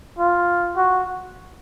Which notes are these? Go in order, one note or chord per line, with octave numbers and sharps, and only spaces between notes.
F4
F#4